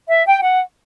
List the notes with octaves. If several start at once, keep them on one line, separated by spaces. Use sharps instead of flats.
E5
G5
F#5